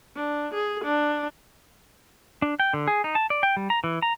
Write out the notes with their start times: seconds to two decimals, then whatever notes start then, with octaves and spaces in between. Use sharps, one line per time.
0.16 D4
0.54 G#4
0.84 D4
2.42 D4
2.60 G5
2.73 D3
2.88 G#4
3.04 D#4
3.15 A5
3.30 D5
3.43 G5
3.57 G3
3.70 A#5
3.84 E3
4.02 A#5